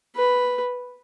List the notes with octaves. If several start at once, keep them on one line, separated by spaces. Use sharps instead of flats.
B4